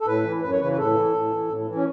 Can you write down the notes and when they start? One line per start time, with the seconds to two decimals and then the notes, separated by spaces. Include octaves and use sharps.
0.01 A4
0.06 A2 B4
0.24 E3
0.42 F#2 B4
0.52 C#5
0.60 C#3 E3 B4
0.72 B4
0.77 A2 A4
0.95 E3
1.13 A2
1.31 E3
1.48 A2
1.67 E3
1.75 C#4